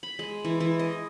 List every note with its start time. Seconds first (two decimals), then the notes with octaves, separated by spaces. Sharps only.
0.03 B5
0.19 G#3
0.45 E3
0.60 E3
0.79 D#5